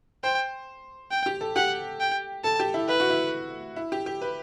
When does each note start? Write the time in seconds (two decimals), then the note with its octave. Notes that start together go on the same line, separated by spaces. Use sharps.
0.24 C5 G5
1.11 G5
1.26 G4
1.41 A4
1.56 G4 F#5
2.00 G5
2.44 A4 A5
2.60 G4
2.74 E4
2.89 E4 B4
3.00 F#4
3.09 E4
3.76 E4
3.92 G4
4.06 G4
4.22 B4